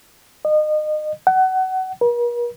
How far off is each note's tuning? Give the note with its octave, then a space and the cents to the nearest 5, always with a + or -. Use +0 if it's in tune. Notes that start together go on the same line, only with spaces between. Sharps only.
D#5 -30
F#5 +25
A#4 +45